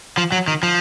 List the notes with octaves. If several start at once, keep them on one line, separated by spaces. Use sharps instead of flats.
F3
F#3
D#3
F3